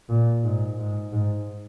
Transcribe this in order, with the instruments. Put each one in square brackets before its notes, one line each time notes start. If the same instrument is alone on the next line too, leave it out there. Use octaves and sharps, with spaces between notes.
[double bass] A#2
G#2
G#2
G#2